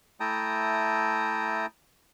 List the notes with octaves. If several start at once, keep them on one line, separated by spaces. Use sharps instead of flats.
A3 E4 G5 A5 A#5 D#6